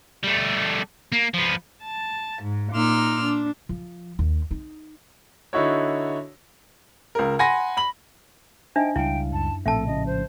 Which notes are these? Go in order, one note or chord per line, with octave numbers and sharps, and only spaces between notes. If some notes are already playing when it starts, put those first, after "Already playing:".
G3 A3
A#3
F3 B3
A5
G#2
A#2 D#4 C6 D6 E6 F6
D4
F3
D#2
D#4
D3 D#4 E4 F#4 C#5
C#2 A#4
F#5 G#5 B5 C6 A#6
B5 F#7
D4 D#4 C5 D#5 E5 G5 G#5
C#2 F3 G3 E4 F5 G5
F#2 A5
A#1 A2 A3 C4 A4 E5 A5
C#3 F3 C#4 D#5
C5